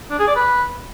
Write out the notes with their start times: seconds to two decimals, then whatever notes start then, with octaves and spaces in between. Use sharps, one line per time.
0.11 D4
0.19 G#4
0.28 D5
0.36 B4